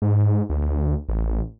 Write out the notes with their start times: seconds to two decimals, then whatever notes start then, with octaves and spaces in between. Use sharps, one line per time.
0.02 G#2
0.50 D2
0.62 D2
1.09 A1